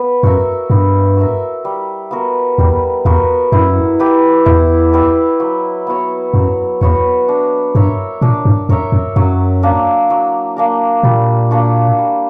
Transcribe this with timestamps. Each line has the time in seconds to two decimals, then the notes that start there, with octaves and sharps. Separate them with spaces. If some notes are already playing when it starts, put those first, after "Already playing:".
Already playing: B3
0.23 F#2 F#4 A#4 E5
0.70 G2 B3
1.17 F#4 A#4 E5
1.65 G3
2.11 B3 F#4 A#4
2.58 E2 G3
3.05 E2 B3 F#4 A#4
3.52 F#2 E4
3.99 G4 B4 E5
4.46 E2 E4
4.93 G4 B4 E5
5.40 F#3
5.87 B3 F#4 C#5
6.34 F#2 F#3
6.81 E2 B3 F#4 C#5
7.28 D4
7.75 G2 A#4 C#5 E5
8.21 A#2 D4
8.45 G2
8.69 F#2 A#4 C#5 E5
8.92 F#2
9.16 F#2 F#3
9.63 A#3 D4 A#4
10.10 F#3
10.57 A#3 D4 A#4
11.03 A#2 G3
11.51 A#3 D4 F#4
11.98 G3